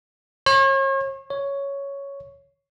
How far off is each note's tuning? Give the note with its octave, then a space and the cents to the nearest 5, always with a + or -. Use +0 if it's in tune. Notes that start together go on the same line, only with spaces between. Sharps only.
C#5 -40
C#5 +5